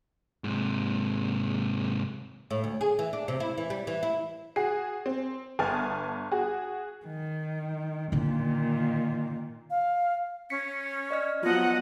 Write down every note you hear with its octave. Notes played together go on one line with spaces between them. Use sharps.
G#2 C3
A2
D2
G#4
E3
D4
C3
E4
E3
G3
E3
E4
F#4 G#4 C7
C4
G1 B3 G#5 A5 F6 A6
F#4 G#4
D#3
A#2 D3 D#3 C#4
F5
C#4 B6 C#7
D5 D#5 F6
F3 F#3 B3 F4 D#5 F#5